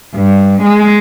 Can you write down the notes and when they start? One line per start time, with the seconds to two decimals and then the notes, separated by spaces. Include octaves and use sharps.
0.15 G2
0.61 G#3